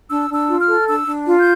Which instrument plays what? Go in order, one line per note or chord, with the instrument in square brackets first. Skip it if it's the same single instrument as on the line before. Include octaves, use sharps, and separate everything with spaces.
[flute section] D4 E6
D4
E6
F4
F6
A4
D4 E6
D4
F4
G6